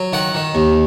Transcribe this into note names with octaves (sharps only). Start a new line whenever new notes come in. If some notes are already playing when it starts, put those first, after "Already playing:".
Already playing: F#3
D#3 F#5
D#3
D#2